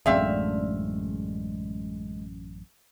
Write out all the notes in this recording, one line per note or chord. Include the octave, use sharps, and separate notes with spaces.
A1 F#2 G#3 A3 C4 D4 E5 F5